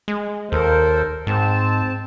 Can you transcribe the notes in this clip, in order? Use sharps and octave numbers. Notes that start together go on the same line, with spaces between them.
G#3
D#2 A4 A#4 C5
G#2 C4 A5